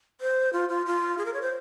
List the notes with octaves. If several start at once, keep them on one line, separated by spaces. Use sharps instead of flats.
C5
F4
F4
F4
G#4
A#4
C#5
C5